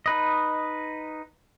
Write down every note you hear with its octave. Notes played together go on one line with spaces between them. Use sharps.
D#4 B4 D#5